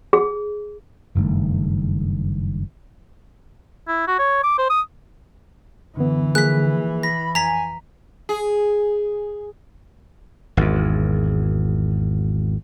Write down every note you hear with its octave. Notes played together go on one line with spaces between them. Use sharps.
G#4
F#1 G2 D#3 A3
E4
F#4
C#5
D6
C5
D#6
F#2 D3 E3 B3
F3 A#3 G#4 F#6 B6
B5 A#6
F2 G#5 A#5 B6
G#4
G#1 E2